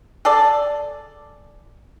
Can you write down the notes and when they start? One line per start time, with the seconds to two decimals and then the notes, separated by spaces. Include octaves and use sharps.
0.25 G#4 A4 D5